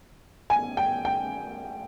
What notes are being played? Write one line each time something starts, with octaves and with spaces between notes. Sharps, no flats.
G#5
G5
G5